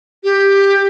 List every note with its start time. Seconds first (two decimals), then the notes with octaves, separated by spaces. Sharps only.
0.24 G4